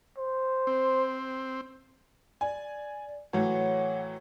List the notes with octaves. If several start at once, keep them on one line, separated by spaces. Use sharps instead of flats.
C5
C4
D5 G#5
A2 E3 F#3 C#5 F#5